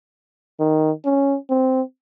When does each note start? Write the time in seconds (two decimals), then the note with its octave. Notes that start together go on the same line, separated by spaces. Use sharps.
0.60 D#3
1.05 C#4
1.50 C4